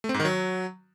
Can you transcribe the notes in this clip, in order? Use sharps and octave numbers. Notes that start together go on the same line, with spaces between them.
A3
C4
G#2
D#3
F#3